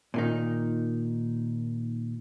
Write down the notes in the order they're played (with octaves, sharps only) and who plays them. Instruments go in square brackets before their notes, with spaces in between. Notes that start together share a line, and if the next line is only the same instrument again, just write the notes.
[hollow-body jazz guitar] A#2 D#3 D#4